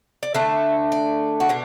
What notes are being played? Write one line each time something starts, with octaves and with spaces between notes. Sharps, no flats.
D5
D3 A3 D4 E5
D5
F#4
B2 D4